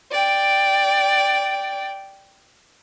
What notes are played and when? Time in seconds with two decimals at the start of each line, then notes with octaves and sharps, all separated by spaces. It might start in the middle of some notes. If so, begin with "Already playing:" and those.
0.10 D5 G5